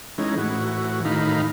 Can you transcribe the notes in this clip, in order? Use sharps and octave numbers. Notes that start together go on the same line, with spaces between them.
E3 G#3 C#4 D#4
A2 E3 F#4
A2 D#3 D#4 F5 B5